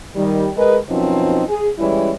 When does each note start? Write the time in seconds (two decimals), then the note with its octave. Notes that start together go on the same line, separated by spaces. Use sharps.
0.16 D#3 G3
0.57 G#3 G#4 A#4 B4 D#5
0.89 F#2 B2 F3 C4 D#4
1.49 G#4
1.79 E3 G3 G#3 C#4 E4